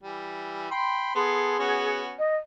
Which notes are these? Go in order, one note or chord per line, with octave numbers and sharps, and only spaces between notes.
E3 G3
G5 B5 C6
B3 G#4 A4 C6
B3 C#4 F#4
D#5